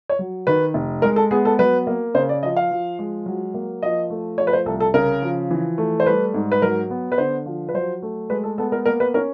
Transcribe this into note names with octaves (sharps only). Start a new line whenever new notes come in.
C#5
F#3
D#3 B4
F1
G#3 A#4
A4
B3 G#4
A4
F#3 B4
A#3
C#3 C5
D5
F3 D#5
F5
F3
G#3
F#3
A#3
F3 D#5
A3
F3 C#5
B4
C5
C2 A4
A4
C#3 A#4
F3
E3
A3
C5
G3 B4
G#2
B4
F#3 A#4
B3
B4
D3 C5
F3
B4
F#3 C5
A3
G#3 B4
A4
B3 A4
A#4
A#3 A#4
B4
C#4 A#4